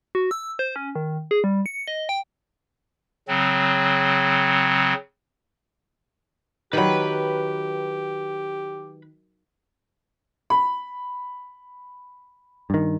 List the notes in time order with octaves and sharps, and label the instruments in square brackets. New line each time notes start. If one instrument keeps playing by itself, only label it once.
[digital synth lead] F#4
E6
C5
C#4
D#3
G#4
G3
C#7
D#5
G5
[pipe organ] C#3 F#3 C4
[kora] D#3 F#3 [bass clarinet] G4 [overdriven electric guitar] B4 B5
[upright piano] B5
[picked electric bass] G2 D#3